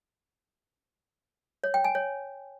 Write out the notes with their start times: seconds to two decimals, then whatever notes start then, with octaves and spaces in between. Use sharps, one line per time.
1.64 C#5
1.74 G5
1.84 G#5
1.95 C#5